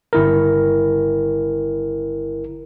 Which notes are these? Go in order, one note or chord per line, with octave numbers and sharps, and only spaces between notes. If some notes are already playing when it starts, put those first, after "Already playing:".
G1 E4 A#4